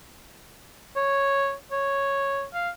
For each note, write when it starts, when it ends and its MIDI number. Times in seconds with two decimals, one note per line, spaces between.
0.96 1.54 73
1.72 2.45 73
2.54 2.70 77